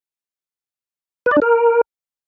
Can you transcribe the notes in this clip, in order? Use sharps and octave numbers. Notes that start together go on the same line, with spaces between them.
B4
D5
D4
A#4